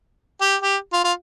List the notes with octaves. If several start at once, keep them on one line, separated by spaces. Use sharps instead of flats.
G4
G4
F4
F4